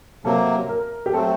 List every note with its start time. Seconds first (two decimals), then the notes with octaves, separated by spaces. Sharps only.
0.25 C3 F#3 A#3 A4
0.69 A#4
1.06 G4
1.13 F#3 A3 C4 A4